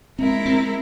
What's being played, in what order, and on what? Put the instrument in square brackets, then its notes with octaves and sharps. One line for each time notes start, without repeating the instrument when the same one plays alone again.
[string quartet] G#3 E4 A#4 [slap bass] C4
[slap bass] C4